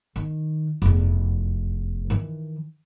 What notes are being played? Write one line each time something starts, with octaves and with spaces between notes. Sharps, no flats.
D#3
F1 E2
D#3 E3